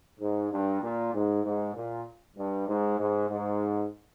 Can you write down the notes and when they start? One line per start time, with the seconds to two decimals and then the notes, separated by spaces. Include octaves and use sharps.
0.20 G#2
0.52 G2
0.81 A#2
1.14 G#2
1.44 G#2
1.74 A#2
2.37 G2
2.67 G#2
2.98 G#2
3.29 G#2